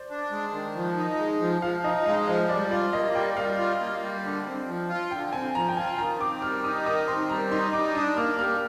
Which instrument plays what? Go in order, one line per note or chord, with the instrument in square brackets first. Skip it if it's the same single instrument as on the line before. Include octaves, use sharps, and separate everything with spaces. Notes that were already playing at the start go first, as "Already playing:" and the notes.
Already playing: [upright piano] C5 D5
[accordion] D4
G#3
D#3
F3
D#4
G#3
F3
[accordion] F3 [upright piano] F5
[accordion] D#4 [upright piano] D#5
[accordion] G#3 [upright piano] F5
[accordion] F3 [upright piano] D#5
[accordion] G3 [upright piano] D5
[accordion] F4 [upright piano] D5
[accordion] A#3 [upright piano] D#5
[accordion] G3 [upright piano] G5
[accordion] G3 [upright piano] F5
[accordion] F4
A#3
G3
D3
C4
F3
F4
[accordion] D3 [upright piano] G5
[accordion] C4 [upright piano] G#5
[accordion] F3 [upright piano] A#5
[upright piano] G5
[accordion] F4 [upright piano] G#5
[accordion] D#3 [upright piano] A#5
[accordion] C4 [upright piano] D6
[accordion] G3 [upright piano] F6
[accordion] D#4 [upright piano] D#6
[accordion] D#3 [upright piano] D#6
[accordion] C4 [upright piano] C6
[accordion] G3 [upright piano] A#5
[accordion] D#4 [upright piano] C6
[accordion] G3 [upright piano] D6
[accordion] D4 [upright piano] D#6
[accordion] A#3 [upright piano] F6
[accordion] G3 [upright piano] F6